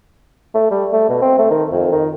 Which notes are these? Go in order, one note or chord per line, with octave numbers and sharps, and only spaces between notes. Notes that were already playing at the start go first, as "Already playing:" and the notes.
A3
G3
A3
B2
C4
A3
D#3
F2
D#3